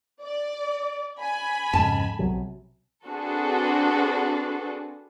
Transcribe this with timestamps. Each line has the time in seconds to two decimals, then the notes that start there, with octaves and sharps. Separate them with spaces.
0.22 D5
1.20 G#5 B5
1.73 F2 G#2 C#3 A5
2.19 B1 C3 F#3
3.06 C4 D4 F#4 G#4 A4 B4